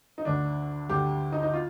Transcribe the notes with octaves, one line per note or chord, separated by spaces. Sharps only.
D#4
D2 D3 D4
D2 D3 G4
D#4
D#4
F4